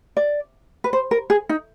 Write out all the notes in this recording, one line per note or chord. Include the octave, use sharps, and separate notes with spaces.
D5
B4
C5
A#4
G#4
D#4